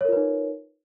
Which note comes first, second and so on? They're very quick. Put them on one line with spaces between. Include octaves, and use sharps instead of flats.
C#5 A#4 F4 B4 D#4